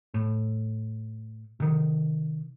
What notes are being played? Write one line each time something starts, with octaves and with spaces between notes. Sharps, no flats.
A2
C3 D#3